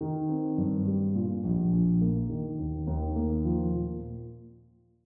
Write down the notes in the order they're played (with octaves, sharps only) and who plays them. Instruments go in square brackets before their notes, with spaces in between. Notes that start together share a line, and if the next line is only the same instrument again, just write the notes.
[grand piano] D#3
C4
G2
G3
A#2
A#1
A#1
A#3
D#3
D#2
D#2
A#3
F3
A#2